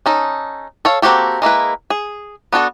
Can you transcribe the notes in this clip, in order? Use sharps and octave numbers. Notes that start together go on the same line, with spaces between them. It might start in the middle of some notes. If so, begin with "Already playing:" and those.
C#4 D#4 A4
A4 C#5 F5
A#3 C4 F#4 G4 A4
G#3 A#3 E4 B4
G#4
B3 D4 F#4 A4